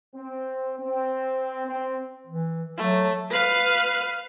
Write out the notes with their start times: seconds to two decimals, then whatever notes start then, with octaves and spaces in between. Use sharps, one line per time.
0.15 C4
0.79 C4
1.68 C4
2.27 E3
2.77 F#3 A3
3.31 B4 F5